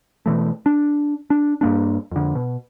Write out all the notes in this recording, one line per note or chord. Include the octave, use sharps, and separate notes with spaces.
B2 E3 A3
D4
D4
G2 A#3 D4
F2 D3
B2